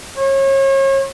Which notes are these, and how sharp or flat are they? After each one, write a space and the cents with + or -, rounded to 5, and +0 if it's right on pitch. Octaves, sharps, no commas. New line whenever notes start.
C#5 -35